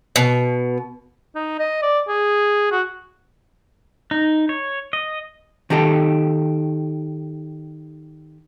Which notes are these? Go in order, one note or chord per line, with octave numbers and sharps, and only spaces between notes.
B2
D#4
D#5
D5
G#4
F#4
D#4
C#5
D#5
D#3 D#4 G4 A4